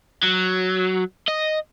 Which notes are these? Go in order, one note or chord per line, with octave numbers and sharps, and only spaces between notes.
F#3
D#5